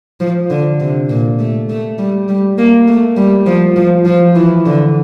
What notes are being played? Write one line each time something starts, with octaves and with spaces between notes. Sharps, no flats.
F3
D3
C3
A#2
A3
A3
G3
G3
A#3
A3
G3
F3
F3
F3
E3
D3